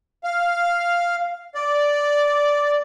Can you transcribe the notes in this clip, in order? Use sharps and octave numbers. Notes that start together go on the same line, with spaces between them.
F5
D5